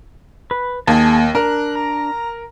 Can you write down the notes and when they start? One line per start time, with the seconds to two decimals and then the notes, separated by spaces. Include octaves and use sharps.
0.51 B4
0.87 D#2 A#3 G#4 A5
1.35 D4 A#4 F#6
1.76 A#5